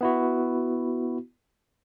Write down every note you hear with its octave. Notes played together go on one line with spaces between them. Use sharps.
B3 E4 F#4